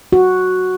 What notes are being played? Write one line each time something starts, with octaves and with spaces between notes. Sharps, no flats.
F#4